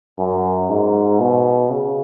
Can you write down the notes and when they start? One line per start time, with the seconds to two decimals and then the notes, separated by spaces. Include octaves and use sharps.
0.19 F#2
0.70 G#2
1.20 B2
1.70 C#3